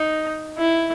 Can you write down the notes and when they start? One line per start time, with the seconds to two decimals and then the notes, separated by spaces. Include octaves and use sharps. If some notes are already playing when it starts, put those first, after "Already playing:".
Already playing: D#4
0.58 E4